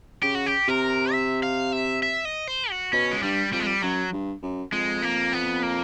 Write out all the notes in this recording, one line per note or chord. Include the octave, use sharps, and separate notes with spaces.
C#3 G4
F#4
G4
C3 A#4
E5
F5
E5
E5
D#5
C5
F#4
B2 C#4
G#3
G2 G3
F2 G3
G#3
G3
F#2 F#3
G2
F#2
F2 G#3
A#3
B3
A#3